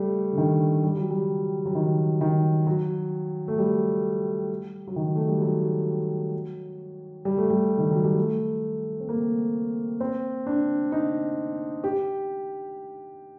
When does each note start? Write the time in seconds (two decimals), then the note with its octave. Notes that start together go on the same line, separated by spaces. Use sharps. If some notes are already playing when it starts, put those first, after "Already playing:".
Already playing: G3 A3
0.33 D3
0.38 D#3
0.84 G3
0.97 F#3
1.10 G3
1.65 F#3
1.75 D#3
2.21 D#3
2.67 F#3
3.48 A3
3.58 G3
4.87 F#3
4.96 D#3
5.15 A3
5.28 G3
5.42 F#3
7.25 G3
7.38 A3
7.50 G3
7.78 D#3
7.91 F#3
8.04 G3
8.17 A3
9.00 C4
9.09 A#3
10.00 C4
10.46 D4
10.92 D#4
11.84 G4